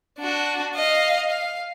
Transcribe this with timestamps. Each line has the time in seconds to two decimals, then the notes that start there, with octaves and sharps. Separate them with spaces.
0.19 D4 F#4
0.75 D#5 F5
1.29 F5